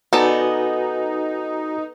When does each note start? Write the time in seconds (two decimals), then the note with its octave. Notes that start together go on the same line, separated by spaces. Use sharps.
0.13 B3 D#4 F#4 A4 B4 D5 G#5